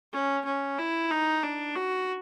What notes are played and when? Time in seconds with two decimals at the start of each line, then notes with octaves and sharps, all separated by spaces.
0.13 C#4
0.45 C#4
0.79 E4
1.11 D#4
1.44 D4
1.76 F#4